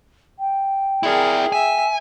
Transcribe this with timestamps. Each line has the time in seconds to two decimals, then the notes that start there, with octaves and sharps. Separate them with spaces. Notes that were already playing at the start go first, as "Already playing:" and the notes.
0.39 G5
1.03 E4 G#4 A#4 D5
1.52 E5 G#5